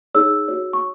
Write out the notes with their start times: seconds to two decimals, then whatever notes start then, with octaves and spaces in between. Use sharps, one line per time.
0.15 D#4 G#4 C#5 E6
0.48 F#4 C#5
0.73 C#6